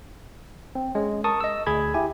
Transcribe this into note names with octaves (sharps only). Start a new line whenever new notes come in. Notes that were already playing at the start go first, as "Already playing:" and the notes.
C4
G#3 C#4
A#4 A5 C#6 D#6
D#5 E6
D2 G#4 B5 G#6
E4 G4 G#5